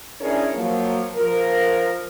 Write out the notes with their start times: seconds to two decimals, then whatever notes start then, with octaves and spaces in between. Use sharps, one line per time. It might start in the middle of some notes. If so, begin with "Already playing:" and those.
0.21 C#4 D4 E4 G#4 A#4 C#5
0.54 F3 F#3 A#3
1.16 F3 A#4